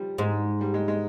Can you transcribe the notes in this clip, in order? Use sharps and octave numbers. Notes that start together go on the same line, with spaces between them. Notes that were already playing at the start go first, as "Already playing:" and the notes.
Already playing: F3 G3
G#2 G#3
G3
G#3
G#3